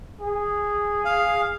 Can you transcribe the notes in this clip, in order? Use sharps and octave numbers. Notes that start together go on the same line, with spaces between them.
G#4
F5